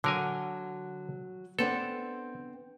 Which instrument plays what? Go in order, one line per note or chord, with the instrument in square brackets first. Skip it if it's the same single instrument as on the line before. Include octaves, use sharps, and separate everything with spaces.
[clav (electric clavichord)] D3 A#4 G#5 [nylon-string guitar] F#3
[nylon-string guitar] B3 C4 D4 [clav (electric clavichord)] A4